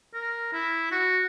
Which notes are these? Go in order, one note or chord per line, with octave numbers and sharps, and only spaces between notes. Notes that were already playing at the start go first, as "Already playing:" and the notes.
A#4
E4
F#4